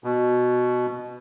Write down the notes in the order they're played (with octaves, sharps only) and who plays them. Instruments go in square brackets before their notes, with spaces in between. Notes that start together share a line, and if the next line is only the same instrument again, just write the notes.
[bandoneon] B2